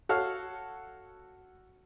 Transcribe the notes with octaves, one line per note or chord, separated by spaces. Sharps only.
F#4 A4 C#5 F5 F6